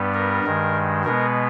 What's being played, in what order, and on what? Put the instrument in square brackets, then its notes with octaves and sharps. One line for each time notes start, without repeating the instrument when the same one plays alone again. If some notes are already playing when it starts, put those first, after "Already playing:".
Already playing: [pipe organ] G2 G3 B3
A#4
G2 D#3 G#3
B2 G#3 B3 A#4